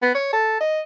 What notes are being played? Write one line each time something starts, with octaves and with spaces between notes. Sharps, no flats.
B3
C#5
A4
D#5